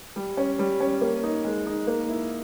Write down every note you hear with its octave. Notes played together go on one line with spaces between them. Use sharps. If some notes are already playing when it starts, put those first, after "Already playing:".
G3
C#4
G3
C#4
A#3
D#4
G#3
D#4
A#3
E4